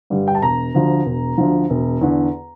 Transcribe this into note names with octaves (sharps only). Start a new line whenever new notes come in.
G2 D3 G3
G5
A5
E1 A#5
D2 D3 F3
E1
D2 D3 F3
E1
E2 D3